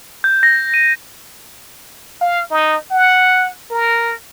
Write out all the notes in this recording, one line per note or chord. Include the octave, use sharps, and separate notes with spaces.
G6
A#6
D#7
F5
D#4
F#5
A#4